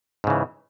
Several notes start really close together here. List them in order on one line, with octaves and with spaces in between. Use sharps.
G#2 C#3 E3